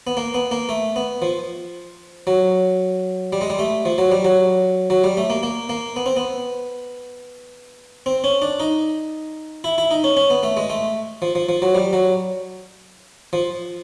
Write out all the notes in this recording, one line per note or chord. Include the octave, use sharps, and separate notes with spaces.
B3
A#3
B3
A#3
A3
B3
F3
F#3
G3
G#3
G3
A3
F3
F#3
G3
F#3
F#3
G3
A3
A#3
A#3
A#3
B3
C4
B3
C4
C#4
D4
D#4
E4
E4
D#4
C#4
C#4
B3
A3
G#3
A3
F3
F3
F3
F#3
G3
F#3
F3